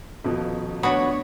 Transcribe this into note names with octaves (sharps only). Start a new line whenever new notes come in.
D#1 B2 F3
B3 D4 F#4 C#5 B5 D#6